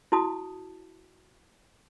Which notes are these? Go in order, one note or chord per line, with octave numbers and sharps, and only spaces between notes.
E4 F#4 A5 D#6